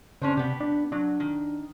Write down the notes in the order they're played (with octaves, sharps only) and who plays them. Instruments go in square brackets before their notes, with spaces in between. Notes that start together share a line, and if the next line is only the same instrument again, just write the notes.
[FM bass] C#3 [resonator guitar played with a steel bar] C#4 D4 C5
[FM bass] C3 [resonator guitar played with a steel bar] B3 G4
[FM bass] D4
[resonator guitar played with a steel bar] F#3 [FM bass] D4
[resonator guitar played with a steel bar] D#3